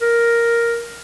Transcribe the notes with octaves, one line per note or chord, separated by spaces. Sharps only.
A#4